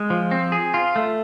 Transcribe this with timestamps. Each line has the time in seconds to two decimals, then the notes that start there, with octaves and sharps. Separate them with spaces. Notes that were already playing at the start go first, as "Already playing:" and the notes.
Already playing: G#3
0.10 F3
0.31 C4
0.52 G#4
0.74 F4
0.96 A3